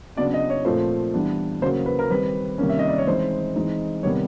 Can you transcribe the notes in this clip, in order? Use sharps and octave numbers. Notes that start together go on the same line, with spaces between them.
C#3 F#3 B3 D4 D5
D#5
C#5
A#2 F3 A3 C4 C5
E3 G3 B3 D4
C#3 F#3 A#3 C5
B4
A#4
D#3 G3 C4 B4
C3 D#3 G3 A#3 C#4
E5
D#5
D5
C#5
E3 G#3 C4 D#4 C5
E3 G#3 C4 D#4
C3 D#3 G3 B3 C#5